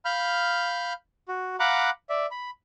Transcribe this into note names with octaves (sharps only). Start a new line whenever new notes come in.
F5 B5 F6 G6
F#4
F5 F#5 A#5 B5 D6 F#6
D5 E5
B5